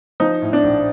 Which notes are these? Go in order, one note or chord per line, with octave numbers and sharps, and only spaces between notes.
F3 D#4
A2
D4
A#1